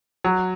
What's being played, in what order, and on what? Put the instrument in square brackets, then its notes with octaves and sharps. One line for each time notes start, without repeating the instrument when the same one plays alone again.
[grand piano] F#3